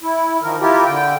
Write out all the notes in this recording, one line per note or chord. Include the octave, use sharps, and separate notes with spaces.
E4
D#3 F3 A#4
E4 F4 G4 A#4
D3 G5